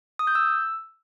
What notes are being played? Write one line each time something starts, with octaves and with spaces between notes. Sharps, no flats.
D#6
G6
E6